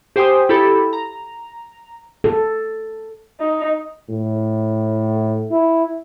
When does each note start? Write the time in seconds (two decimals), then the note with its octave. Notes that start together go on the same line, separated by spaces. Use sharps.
0.16 G4 C5 G5 G#5 C6 D#6
0.49 E4 G4 A4 B5
0.93 A#5
2.24 A4
3.40 D#4
4.10 A2
5.51 E4